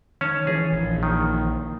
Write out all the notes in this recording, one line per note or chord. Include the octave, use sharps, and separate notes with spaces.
D#3 C#4 C#5 A5
E3 G#4 C#5 A6
A#1
D#3